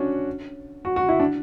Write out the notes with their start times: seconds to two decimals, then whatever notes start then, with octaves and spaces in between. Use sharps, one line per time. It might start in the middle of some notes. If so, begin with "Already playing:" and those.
Already playing: C#4 D4 F#4
0.85 F#4
0.96 F#4
1.09 E4
1.20 D4